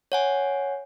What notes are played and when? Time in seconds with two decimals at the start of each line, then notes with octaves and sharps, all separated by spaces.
0.12 C#5 F#5 G#5